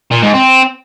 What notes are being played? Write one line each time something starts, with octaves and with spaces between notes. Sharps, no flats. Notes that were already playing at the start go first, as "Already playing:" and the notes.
A#2
G#2
C4